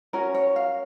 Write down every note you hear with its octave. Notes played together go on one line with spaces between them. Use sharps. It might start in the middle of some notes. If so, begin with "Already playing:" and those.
C#4 F#4 A#4 C#5
C#5
F5